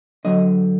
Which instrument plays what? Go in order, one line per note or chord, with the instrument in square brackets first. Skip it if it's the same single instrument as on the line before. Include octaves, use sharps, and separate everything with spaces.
[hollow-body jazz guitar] D3 F#3 D#5